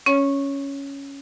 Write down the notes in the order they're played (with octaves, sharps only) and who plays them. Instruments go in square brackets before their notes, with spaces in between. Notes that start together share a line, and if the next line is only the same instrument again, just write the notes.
[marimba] C#4 C#5